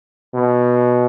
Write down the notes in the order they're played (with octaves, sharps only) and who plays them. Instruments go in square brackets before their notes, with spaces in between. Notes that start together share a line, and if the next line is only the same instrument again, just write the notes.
[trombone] B2